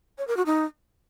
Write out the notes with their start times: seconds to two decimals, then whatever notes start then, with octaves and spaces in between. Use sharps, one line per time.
0.18 C#5
0.27 A#4
0.37 F#4
0.46 D#4